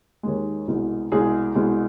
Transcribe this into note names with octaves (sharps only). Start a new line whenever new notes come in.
D#2 D#3 G#3
C2 B2 G#3
C2 B2 G#3 G#4
C2 B2 G#3